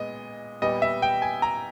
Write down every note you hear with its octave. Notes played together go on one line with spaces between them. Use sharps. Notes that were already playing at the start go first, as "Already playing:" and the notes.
Already playing: A#2 G#3 B3 D#5
A#2 G3 B3 D#5
E5
G5
G#5
A#5